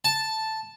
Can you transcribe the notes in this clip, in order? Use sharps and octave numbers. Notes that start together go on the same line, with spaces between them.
A5